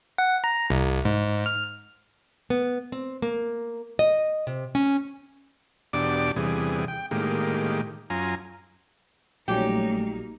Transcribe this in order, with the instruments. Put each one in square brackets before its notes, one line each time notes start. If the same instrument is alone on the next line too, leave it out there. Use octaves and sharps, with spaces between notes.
[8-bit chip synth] F#5
A#5
C2
G#2
F6
[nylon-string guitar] B3
C4
A#3
D#5
C3
C#4
[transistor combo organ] E2 B2 D4 G4 D5 D6
E2 C3 E3 G3 G#4
G5
A2 D#3 G#3 A#3 G4
F#2 F4 G#5 A#5
[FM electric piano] A#1 F#3 G3 [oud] A3 C#4 [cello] A#3 D#4 [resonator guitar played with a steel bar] G4